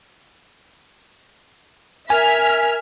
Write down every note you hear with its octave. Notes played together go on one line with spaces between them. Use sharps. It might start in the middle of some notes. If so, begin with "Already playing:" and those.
A#4 E5 G#5 F6 B6